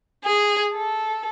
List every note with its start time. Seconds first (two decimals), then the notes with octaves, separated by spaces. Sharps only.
0.24 G#4
0.74 A4